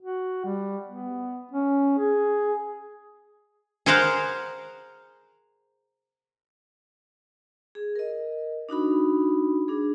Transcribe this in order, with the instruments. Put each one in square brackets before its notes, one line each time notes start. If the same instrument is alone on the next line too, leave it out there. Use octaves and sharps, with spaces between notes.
[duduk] F#4
G3
B3
C#4
G#4
[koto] G#4 A#4 C5 F5 F#5
[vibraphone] G#4
A#4 D#5
D4 D#4 F#4 B5
D4 G#4